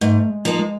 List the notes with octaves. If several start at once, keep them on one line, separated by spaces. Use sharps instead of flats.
G#2 A3
G#3
F3 A#3 D#4
G#3